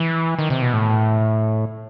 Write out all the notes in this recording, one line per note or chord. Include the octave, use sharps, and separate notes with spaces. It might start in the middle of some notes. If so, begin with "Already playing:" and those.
Already playing: E3
D#3
C3
B2
A2